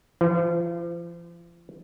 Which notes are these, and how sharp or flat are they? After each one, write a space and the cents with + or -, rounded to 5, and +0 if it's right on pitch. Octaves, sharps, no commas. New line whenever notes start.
F3 -40